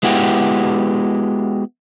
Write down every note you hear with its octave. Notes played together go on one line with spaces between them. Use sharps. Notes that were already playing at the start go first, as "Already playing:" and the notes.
G#3 B3 E4 F#4 G4